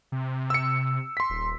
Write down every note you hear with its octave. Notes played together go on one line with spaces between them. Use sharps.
C3
E6 C#7
C6 B6
D#1